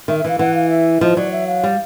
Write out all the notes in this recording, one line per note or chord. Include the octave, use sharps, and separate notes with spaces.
D#3 E5
E5
E3 F5
E3 F#5
F5
E5
F3 D#5
F#3 D5
E5
F5
G3